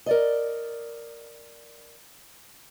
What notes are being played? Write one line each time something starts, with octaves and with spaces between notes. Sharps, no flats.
A#4 D5 D#5